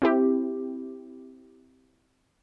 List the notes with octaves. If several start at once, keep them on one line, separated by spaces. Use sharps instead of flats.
C4 E4 G4